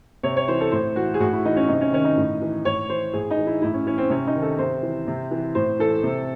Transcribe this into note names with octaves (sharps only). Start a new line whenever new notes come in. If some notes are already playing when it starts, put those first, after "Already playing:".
C3 C#5
C#5
E3 C5
A4
A2 C5
E3 F#4
G#4
A2 F#4
E4
E3 D#4
C#4
C3 D#4
C#4
D#3 C#4
D#4
A2
E3
A2 C#5
E3 C5
A2 G#4
D#4
E3
E4
A2 E4
C#4
E3 C#4
C4
C3 C#4
D#4
D#3
A4
C3 C5
E3
C3
E3
A2 C5
E3 A4
C3